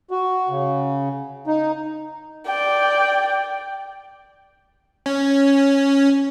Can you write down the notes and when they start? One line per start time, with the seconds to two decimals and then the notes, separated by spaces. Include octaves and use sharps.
0.11 F#4
0.49 C#3
1.47 D#4
2.46 D5 G5
5.06 C#4